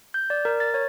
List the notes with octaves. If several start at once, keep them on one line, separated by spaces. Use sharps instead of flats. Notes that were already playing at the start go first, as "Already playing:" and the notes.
G6
D5
A#4
A6
C#5